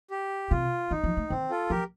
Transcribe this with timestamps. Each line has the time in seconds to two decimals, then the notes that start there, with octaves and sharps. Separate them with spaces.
0.11 G4
0.50 C3 F4
0.91 D#3 D#4
1.04 F3
1.17 A3
1.30 D#3 C4
1.50 F4 A4
1.70 F3 G4 A#4